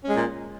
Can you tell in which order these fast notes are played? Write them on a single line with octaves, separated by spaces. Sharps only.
C#4 G#3 A#2